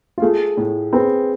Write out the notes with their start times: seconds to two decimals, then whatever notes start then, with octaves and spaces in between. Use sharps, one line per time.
0.18 F4
0.22 A3 G#4
0.57 A2
0.93 C4 G#4 B4